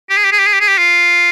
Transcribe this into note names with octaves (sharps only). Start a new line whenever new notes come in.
G4
G#4
G4
G#4
G4
G#4
G4
G#4
G4
F4